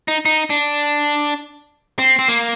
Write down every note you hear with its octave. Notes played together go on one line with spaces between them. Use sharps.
D#4
D#4
D4
C4
C4
A#3